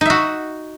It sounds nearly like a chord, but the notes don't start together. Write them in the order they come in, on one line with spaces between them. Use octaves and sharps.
D#4 E5 F#4